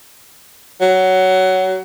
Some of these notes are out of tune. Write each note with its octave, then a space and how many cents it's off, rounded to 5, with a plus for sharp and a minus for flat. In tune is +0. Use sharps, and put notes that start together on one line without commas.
F#3 +15